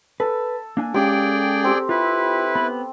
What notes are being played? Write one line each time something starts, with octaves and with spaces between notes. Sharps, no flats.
A4 B4
A#3 D4 G#5
G#3 C#4 G4 G#4 D5 F5 G5 D6
C4 G4
E4 F4 B4
B3 B5